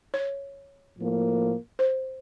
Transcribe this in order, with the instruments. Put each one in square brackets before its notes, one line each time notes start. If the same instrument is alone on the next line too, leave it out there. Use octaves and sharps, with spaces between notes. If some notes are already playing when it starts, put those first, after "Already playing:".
[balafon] C#5
[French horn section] A2 F3 A#3
[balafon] C5